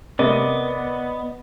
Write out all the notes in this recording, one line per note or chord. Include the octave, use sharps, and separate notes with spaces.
C3 A#3 B3 D5 D#5